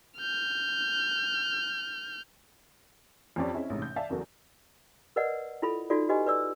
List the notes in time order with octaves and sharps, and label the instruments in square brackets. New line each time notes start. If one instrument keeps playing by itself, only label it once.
[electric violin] F6 G6
[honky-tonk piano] F2 C4 C#4 G4 D5 C#6
C4 C#4 E4 G#4 D#5 E5
A1 G#2 C3
G6
D5 E5 F5 G#5 A5
F#1 E2 F#4 A4 A#4
[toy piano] A#4 B4 D5 D#5 F#5
E4 F4 A4 B5
D#4 F4 F#4 A4 D5
F#4 G4 B4 D#5 G#5
B4 D5 E6